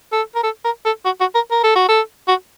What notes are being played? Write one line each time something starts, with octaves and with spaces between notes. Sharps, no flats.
A4
A#4
A4
A#4
A4
F#4
F#4
A#4
A#4
A4
F#4
A4
F#4